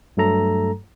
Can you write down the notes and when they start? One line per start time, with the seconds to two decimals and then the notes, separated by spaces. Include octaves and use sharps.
0.17 G2 F#3 A3 A4 A#5